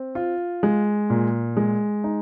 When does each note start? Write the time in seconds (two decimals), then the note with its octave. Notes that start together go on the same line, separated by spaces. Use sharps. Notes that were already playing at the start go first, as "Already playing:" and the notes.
Already playing: C4
0.15 F4
0.63 G#3
1.10 A#2
1.57 G#3
2.04 D#4